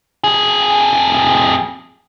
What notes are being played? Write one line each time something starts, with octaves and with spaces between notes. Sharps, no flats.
F2 G#4